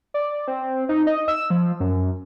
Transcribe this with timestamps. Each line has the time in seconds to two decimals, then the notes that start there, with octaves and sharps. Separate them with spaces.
0.14 D5
0.47 C4
0.89 D#4
1.07 D#5
1.28 E6
1.50 F3
1.80 F#2